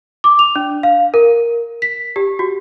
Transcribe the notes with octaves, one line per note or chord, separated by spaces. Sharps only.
D6
F7
D4
F5
A#4
B6
G4
F#4